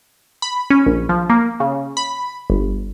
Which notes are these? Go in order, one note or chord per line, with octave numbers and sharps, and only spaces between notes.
B5
C#4
A#1
F3
A#3
C#3
B5
G1